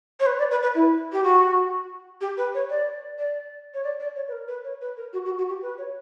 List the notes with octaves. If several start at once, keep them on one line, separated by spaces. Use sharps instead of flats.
C#5
B4
D5
B4
B4
E4
G4
F#4
G4
B4
C#5
D5
D5
C#5
D5
D5
C#5
B4
A#4
B4
C#5
B4
A#4
F#4
F#4
F#4
G4
B4
C#5